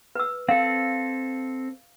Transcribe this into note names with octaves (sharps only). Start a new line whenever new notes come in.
B4 E6
C4 A4 F5